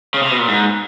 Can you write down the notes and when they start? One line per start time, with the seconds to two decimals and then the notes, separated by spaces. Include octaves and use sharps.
0.14 C#3
0.22 C3
0.31 B2
0.39 A#2
0.48 G#2